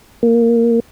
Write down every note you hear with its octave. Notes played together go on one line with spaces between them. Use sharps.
A#3